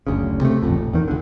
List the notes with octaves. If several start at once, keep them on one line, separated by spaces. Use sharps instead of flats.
F#1 D2 C#3
C3 A3
D#1 A1 F2
D#1
E2 D#3
C#2 D3